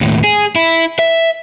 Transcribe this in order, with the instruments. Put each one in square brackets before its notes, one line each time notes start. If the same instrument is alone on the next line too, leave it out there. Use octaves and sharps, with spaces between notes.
[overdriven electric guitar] D#2 A2
G#4
E4
E5